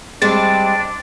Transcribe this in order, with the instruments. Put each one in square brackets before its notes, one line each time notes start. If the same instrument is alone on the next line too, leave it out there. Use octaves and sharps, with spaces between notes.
[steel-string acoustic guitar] G3 G#3 C4 [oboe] D4 [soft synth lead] A6